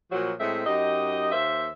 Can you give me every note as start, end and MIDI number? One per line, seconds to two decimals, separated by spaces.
0.11 0.31 46
0.11 0.31 53
0.11 0.31 54
0.11 0.31 66
0.38 0.62 45
0.38 0.62 56
0.38 0.62 57
0.38 0.62 60
0.38 0.62 76
0.65 1.31 42
0.65 1.31 63
0.65 1.31 67
0.65 1.31 75
1.31 1.68 39
1.31 1.68 58
1.31 1.68 72
1.31 1.68 76